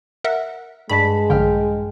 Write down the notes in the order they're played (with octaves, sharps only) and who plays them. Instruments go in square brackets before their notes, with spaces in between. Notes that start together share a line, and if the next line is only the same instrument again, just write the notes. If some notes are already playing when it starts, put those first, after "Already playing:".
[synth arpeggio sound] A#4 E5 F#5
[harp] G2 A5 B6 [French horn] G#3 [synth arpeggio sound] B5
[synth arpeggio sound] A#1 D3 [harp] G5 F6